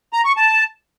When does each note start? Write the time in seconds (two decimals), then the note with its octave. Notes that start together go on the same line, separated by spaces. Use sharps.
0.13 A#5
0.25 C#6
0.37 A5